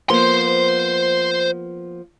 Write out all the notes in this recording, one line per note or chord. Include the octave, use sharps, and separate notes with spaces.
F3 A#3 B3 C5 C6